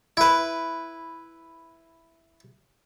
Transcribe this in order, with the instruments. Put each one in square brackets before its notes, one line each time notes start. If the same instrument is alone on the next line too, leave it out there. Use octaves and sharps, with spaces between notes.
[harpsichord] E4 B4